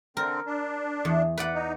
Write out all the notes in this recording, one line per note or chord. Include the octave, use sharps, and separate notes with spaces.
D3 C4 A#4
D4
E2
B4 D5 F#5
D#4